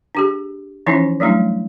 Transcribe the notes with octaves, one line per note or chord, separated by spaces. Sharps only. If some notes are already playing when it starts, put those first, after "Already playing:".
D4 G4 G#4
E3 F3 C#4 D#4 E4
F#3 G3 A3 D4 E4